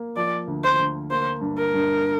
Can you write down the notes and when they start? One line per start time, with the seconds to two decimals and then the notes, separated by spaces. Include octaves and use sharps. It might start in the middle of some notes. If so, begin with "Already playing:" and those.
Already playing: A#3
0.16 F3 D5
0.48 D2
0.64 C5
0.79 D2
1.10 A#3 C5
1.41 G2
1.58 A#4
1.74 G2